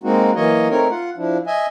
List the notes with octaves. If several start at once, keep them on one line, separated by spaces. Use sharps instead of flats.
G#3 A#3 C4 D#4 F#4
E3 F#3 A#3 C#5 D#5
A3 C4 D#4 A#4 C#5
F4 F#5
F3 D4 E4
D#5 E5 G#5